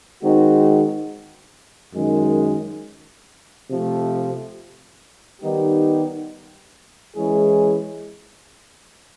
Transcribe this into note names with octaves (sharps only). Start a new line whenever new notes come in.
D#3 G#3 C4 D#4 F#4
F#2 D#3 G#3
C3 F3 A3
D#3 G3 B3 D#4 G4
E3 G#3 C#4 E4 G#4